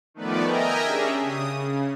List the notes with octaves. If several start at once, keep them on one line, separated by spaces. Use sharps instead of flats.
D#3 F3 A3 B3 B4 D5
A#4 D#5 E5 G5 G#5 A#5
C#4 D4 G4 G#4 E5
C#3 D#6
C#3